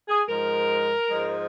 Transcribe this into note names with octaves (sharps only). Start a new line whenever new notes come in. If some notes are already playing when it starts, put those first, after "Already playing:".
G#4
G#2 F3 G#3 A#4
G#2 F3 G#3